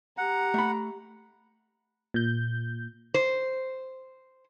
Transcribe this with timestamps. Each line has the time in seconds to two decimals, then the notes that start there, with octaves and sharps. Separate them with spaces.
0.18 G4 F#5 A#5
0.54 A3 B5
2.14 A#2 G6
3.14 C5